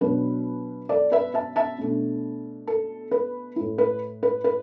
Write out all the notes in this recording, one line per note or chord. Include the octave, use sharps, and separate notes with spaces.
B2 F#3 D4 B4
A4 D5
B4 E5
E5 A5
E5 A5
B2 A3 D4
A4
B4
A2 A3 E4
B4
B4
B4